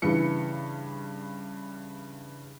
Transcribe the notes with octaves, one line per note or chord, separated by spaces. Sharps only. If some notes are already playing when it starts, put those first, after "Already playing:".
G2 C#3 E3 C#7